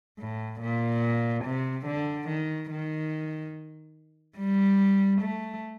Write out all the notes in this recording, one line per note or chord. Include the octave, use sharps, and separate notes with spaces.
A2
A#2
C3
D3
D#3
D#3
G3
A3